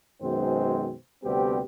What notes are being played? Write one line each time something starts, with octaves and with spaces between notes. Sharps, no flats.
F#2 B2 D#3 G#3 C4 C5
D2 C3 G3 B3 C4 G4